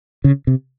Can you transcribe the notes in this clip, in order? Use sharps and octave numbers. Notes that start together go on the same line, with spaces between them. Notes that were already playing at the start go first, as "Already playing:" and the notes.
C#3
C3